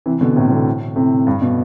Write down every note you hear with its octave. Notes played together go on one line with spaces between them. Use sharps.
C3 E3
B2 D3
A2 C3
B2 D3
A2 C3
G2
B2